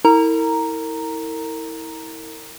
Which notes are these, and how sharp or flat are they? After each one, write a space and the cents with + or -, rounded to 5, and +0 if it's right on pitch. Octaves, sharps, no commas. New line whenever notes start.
E4 -25 A#4 -35 A#5 +0